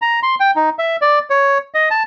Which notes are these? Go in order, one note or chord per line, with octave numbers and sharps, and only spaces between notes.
A#5
C6
G5
D#4
E5
D5
C#5
D#5
A5